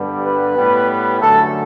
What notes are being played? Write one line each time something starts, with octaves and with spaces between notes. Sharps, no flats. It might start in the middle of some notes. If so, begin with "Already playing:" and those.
Already playing: G2 D3 G3 B3
B4
A2 G3 B3
F#2 D3 A3 A4